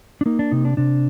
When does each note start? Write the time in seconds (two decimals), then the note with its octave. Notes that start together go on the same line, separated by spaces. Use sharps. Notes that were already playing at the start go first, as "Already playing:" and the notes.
0.21 D4
0.26 A#3 D#4
0.39 D4
0.51 C3 D#4
0.65 D4
0.77 C3 D4